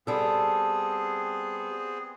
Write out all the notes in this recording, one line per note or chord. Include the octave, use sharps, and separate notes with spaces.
G3 B3 C4 G#4 A4